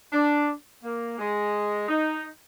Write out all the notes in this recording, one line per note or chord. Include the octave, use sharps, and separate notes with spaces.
D4
A#3
G#3
D#4